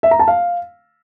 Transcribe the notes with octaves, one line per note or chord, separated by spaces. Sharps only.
E5
A#5
A5
F5